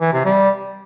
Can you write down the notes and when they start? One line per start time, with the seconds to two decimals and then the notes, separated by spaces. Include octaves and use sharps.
0.01 E3
0.13 C3
0.25 G3